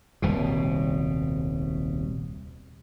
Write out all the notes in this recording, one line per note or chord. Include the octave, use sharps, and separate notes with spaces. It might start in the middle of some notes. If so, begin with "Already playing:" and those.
D#1 C2 B2